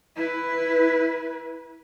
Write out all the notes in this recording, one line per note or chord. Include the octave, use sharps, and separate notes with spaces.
E4 B4